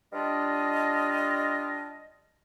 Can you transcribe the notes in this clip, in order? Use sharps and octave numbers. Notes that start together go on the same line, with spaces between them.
G3 D4 F4 D#5